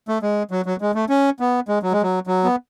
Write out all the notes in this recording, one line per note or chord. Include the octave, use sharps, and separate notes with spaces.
A3
G#3
F#3
F#3
G#3
A3
C#4
B3
G#3
F#3
G#3
F#3
F#3
B3